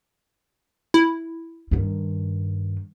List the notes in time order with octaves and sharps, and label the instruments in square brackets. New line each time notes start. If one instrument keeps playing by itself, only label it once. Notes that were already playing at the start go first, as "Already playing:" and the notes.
[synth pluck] E4
[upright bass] G2 D#3